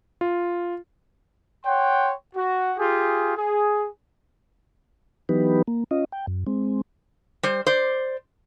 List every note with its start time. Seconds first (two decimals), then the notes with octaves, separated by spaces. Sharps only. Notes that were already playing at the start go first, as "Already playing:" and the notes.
0.21 F4
1.65 C#5 F#5 G5 C6
2.36 F#4
2.78 F4 G4 G#4
3.37 G#4
5.29 E3 F#3 B3 D#4 G4 B4
5.68 A#3
5.91 C#4 F4 D#5
6.12 G5
6.27 F#2
6.47 G#3 C4
7.43 G3 C5
7.67 C5 D5